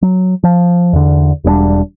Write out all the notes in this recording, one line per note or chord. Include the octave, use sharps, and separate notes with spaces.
F#3
F3
E2 D3
E1 G3 A#3 D4